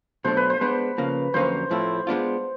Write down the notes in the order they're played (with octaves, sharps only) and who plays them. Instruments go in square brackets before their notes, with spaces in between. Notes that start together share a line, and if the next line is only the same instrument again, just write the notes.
[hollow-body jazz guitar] B2 F#3 A3 D4 [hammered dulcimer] C5
[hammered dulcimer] B4
C5
[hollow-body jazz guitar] G#3 B3 D4 [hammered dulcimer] B4
[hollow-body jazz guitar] C#3 F3 A#3
[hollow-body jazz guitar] F2 D3 F#3 A#3 C#4 [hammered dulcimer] C5
[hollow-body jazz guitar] A2 F3 A3 C4 E4
G#3 B3 D4 F4